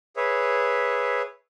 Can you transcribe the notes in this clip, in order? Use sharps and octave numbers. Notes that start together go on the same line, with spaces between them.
G#4 B4 C#5 E5